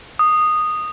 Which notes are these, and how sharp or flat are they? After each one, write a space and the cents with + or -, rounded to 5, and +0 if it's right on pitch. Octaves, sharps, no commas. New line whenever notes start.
D#6 -10